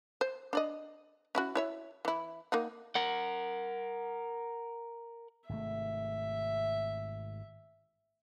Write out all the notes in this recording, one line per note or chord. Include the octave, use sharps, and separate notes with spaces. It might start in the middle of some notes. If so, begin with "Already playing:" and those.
C5
D4 D5 D#5
C#4 E4 F#4
E4 C#5 E5
E3 E4
A#3 D#4 F#5
A#4 F#5
G#1 C3 A3 E5